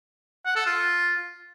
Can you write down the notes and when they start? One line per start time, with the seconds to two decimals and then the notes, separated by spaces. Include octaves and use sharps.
0.46 F#5
0.56 A4
0.66 F4